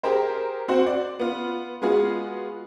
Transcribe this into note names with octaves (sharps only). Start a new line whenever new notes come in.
G4 G#4 A#4 C5
C4 F#4 C5
D5
B3 F4
G#3 B3 F4 F#4 G#4